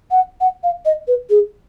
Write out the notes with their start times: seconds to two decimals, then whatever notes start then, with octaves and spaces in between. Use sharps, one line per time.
0.11 F#5
0.41 F#5
0.63 F5
0.85 D#5
1.08 B4
1.30 G#4